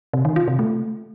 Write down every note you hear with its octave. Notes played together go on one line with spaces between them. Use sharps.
C3
D#3
F4
C3
A3